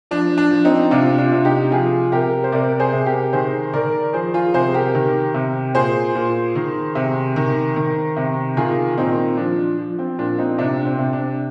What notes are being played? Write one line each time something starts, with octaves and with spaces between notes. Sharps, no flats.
F3 D4
D4
F3
C4 D#4
C3 D4 F4
D4 F4
C3
D#4 G4
F3 F4 G#4
C3 G4 A#4
C5
C3 A#4 D5
G#4 C5
C3
G4 A#4
D#3 G#4 C5
D#3 A#4 D5
F3 G#4 C5
F4 G#4
C3 G#4 C5
G4 A#4
D#3
C3
A#2 G#4 C5
A#2
D#3
C3
D#3
D#3
C3
D#3 F4 G#4
A#2 C4 D#4
F3 D4
F3
C4
A#2 D4
C4 D#4
C3 D4
C4
C3
D4